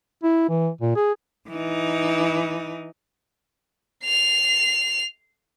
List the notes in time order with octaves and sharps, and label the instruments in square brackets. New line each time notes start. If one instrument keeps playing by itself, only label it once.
[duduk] E4
E3
A#2
G#4
[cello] E3 D#4
[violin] C7 F7